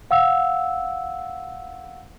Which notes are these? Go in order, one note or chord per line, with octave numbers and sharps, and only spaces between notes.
F5 F#5 E6